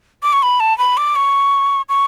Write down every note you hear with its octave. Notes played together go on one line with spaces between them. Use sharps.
D6
C#6
B5
A5
B5
D6
C#6
C#6